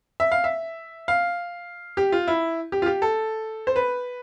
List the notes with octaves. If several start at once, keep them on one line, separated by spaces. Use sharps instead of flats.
E5
F5
E5
F5
G4
F4
E4
G4
F4
G4
A4
C5
B4